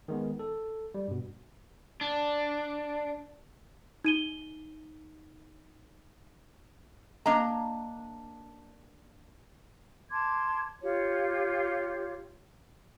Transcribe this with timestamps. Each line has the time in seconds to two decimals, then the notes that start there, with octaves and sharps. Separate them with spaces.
0.08 D#3 G#3 B3
0.39 A4
0.94 G3
1.08 G2 B2
2.01 D4
4.05 D#4 D#7 G7
7.26 A#3 D4 D#5 A#5
10.11 A5 C6 D6 G#6
10.82 F4 G4 C#5